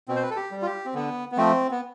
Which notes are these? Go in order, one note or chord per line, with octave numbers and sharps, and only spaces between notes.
B2 C4
C5
B4
A4
G4
G3
F4
G4
C4
D3 B3
B3
F3 A3 C4
B3